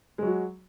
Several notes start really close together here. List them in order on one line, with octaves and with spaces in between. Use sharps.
G#3 F#3 F#4